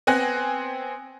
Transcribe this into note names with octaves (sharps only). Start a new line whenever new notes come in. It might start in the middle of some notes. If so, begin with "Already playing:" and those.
B3 C4 G#5 F#6 A#6